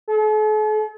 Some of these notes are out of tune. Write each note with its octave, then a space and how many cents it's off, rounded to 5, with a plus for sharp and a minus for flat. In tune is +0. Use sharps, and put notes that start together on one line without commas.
A4 -45